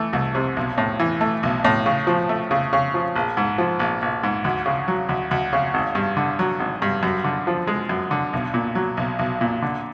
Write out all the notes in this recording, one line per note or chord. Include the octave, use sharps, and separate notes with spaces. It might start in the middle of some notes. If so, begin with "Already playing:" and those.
Already playing: E3 A3
C2
C3
B1
A2
E3
A3
B1
A2
C#3
F3
A3
C#3
C#3
F3
A#1
G#2
F3
A#1
A#1
G#2
D2
C#3
F#3
D2
D2
C#3
G#1
G2
D3
F#3
G#1
G2
F#2
D3
F3
G#3
F#2
D3
B1
A#2
F#3
B1
B1
A#2
D3